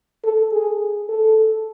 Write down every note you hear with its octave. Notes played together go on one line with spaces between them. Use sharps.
A4
G#4
A4